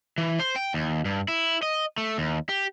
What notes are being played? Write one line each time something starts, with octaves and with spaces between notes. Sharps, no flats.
E3
C5
G5
D#2
G2
E4
D#5
A3
D#2
G4